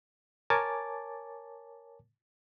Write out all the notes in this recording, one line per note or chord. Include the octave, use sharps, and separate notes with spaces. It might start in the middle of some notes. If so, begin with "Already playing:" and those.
A#4 C#5 G#5 A5 D6 A6